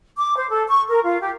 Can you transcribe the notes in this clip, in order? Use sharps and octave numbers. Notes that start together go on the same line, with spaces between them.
D6
C5
A4
C#6
A#4
F4
G4